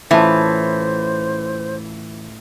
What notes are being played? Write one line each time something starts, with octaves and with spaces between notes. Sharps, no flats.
A2 E3 C#4 F4 C5 E5 A5